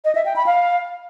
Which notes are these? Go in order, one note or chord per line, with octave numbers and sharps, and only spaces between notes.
D#5
E5
G5
B5
F5